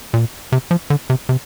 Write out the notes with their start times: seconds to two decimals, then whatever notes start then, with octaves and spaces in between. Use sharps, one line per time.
0.14 A#2
0.52 C3
0.71 F3
0.90 D3
1.10 C3
1.29 C3